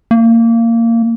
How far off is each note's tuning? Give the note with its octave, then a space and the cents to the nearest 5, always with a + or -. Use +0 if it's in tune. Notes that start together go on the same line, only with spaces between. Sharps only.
A#3 -20